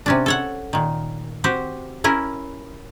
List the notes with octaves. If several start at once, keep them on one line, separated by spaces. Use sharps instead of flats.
C3 C#4 D4
A4 C#5 F#5
A#2 D#3
C4 F#4 G4
C#4 E4 A#4